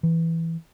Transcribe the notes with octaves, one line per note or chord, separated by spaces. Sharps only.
E3